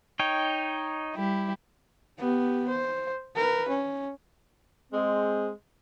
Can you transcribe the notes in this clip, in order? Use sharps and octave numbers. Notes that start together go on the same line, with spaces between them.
D#4 C#5 G5
G3 E4 G4
B3 G4
C5
A#4 B4
C#4
G#3 C4